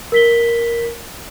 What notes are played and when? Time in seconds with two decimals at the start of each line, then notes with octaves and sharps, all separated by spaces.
0.12 A#4 B6 G7